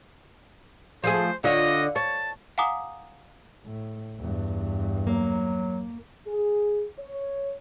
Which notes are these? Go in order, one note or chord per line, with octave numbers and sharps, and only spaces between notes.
F3 A3 G#4 C5
D3 F4 C#5 D#5
C#5 A5
F5 F#5 G#5 A#5 D6 D#6
A2
E2 G2
F#3 A#3
G#4
C#5